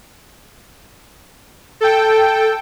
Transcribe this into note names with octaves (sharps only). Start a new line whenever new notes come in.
A4 G5